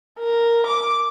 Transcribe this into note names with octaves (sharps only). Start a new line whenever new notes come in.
A#4
D6